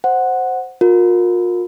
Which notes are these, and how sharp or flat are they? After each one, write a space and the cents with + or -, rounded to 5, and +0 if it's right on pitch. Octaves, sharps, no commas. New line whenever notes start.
C5 +0 F#5 +0
F4 +40 A#4 +0